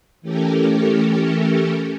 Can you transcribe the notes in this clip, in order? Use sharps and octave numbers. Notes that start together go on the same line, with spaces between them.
E3 A3 C#4 G4 A4 A#4